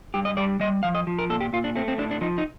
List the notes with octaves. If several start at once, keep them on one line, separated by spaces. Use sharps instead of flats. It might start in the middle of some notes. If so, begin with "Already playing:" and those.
G2 G4
D#5
G3 D5
G3 D#5
F3 F5
D#5
F3
A#4
A#2 A4
G4
A#2 F4
D4
A3 C4
C4
A2 D4
D4
F3 D#4
D#4